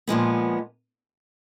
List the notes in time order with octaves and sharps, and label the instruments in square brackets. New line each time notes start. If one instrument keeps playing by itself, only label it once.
[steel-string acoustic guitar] A#2 F3 G#3 B3